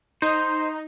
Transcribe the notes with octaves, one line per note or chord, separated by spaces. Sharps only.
D#4 C5